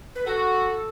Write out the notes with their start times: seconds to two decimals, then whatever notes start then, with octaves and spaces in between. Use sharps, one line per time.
0.15 B4
0.26 F#4 A4